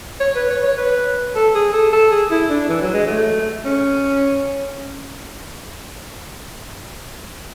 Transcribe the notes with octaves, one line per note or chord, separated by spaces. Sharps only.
C#5
B4
C#5
C#5
B4
A4
G#4
A4
A4
G#4
E4
D4
E3
F#3
G#3
A3
C#4